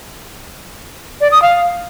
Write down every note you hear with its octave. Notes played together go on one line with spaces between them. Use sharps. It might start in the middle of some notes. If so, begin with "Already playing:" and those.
D5
D#6
F5